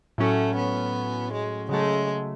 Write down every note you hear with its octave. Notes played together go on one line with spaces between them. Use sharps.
A2 F#3 A3 C#4
B3
G#3
C#3 F#3 G#3 A3